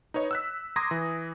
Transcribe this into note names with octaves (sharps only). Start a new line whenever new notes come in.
D#4 B4 C#5 D#5
E6 F#6 B6
A#5 C6 D6 D#6 G#6 A#6
E3